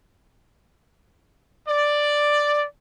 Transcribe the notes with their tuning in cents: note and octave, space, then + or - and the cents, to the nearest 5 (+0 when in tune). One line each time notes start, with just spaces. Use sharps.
D5 +5